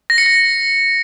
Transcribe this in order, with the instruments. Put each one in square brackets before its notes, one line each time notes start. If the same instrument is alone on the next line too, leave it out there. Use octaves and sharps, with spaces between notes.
[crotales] A#6
C#7
A#6